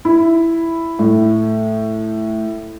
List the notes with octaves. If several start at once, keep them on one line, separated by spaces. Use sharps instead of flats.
E4
A2